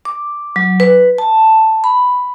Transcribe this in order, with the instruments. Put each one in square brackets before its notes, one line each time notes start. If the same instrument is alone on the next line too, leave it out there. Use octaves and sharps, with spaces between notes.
[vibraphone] D6
F#3
B4
A5
B5